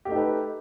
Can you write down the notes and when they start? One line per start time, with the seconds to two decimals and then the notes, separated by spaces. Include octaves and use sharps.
0.05 G4
0.08 A3
0.11 D#4
0.14 A4
0.16 B4